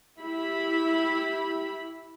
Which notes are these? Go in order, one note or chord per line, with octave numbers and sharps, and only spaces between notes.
E4 G4 B5